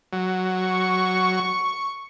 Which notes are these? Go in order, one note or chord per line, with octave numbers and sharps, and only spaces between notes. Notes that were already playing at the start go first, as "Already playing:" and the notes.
F#3
C#6